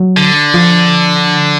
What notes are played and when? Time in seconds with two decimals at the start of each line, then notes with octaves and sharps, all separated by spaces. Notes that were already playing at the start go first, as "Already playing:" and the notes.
Already playing: F#3
0.17 D3
0.54 F3